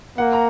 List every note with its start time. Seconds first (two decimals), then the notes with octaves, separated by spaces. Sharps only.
0.18 A#3 F#5
0.33 A#5